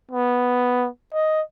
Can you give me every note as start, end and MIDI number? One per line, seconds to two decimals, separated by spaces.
0.12 0.88 59
1.14 1.42 75